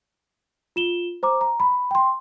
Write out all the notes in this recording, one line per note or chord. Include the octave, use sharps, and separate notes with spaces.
F4 E7 G7
C5 A#5 D6
A#5
B5
G5 C6